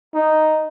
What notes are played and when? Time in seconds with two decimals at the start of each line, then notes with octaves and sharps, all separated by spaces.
0.14 D#4